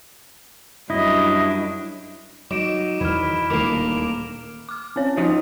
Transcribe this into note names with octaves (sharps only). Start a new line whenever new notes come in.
F#2 G3 D4 E4 D#5
F#3 D#4 D6 D7 E7
E2 D#3 F#3 E4 F6 E7
D#1 D2 D#3 A#3 A#4 D6 F7
D6 F6
C4 C#4 C#5
F3 C4 D#4 D#5